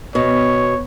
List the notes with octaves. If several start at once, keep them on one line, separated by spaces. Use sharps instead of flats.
B2 C#5